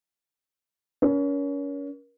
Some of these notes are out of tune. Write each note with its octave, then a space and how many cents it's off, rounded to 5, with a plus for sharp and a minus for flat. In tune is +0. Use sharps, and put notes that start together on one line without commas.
C#4 +30 A#4 +35